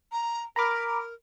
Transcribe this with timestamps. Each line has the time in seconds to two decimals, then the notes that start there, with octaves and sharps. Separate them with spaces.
0.12 A#5
0.56 A#4 A#5 B5 D6